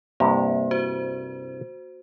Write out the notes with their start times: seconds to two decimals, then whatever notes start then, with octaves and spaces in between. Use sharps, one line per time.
0.20 C2 G2 C3 A#3
0.71 F#4 C5